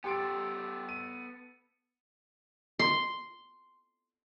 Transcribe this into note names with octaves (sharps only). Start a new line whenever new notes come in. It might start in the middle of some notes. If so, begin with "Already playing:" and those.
B3 G4 A4 C6 D7
D#7
C6